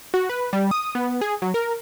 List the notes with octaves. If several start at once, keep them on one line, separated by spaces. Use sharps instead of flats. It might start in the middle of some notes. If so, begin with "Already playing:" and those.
F#4
B4
G3
D#6
B3
G#4
F#3
A#4